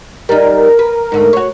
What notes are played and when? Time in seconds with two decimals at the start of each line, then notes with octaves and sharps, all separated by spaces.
0.29 G3 D#4 A#4
0.79 B4
1.12 G#2 D3 A3
1.33 F#4 C#5